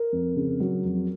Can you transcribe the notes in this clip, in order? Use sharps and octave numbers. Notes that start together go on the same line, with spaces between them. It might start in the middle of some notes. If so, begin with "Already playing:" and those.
Already playing: A#4
F2
C#3
F#3
F2